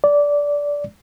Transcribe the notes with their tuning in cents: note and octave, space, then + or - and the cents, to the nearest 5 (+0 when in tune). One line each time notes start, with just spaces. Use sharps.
D5 -15